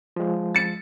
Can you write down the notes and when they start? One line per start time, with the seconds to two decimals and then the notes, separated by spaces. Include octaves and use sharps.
0.16 F3 G#3
0.55 A6 C#7